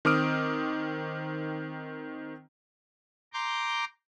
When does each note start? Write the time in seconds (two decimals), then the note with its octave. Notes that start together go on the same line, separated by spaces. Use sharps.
0.05 D#3 C4 D6 D#6 F6 D7
3.33 A#5 C6 D6 G6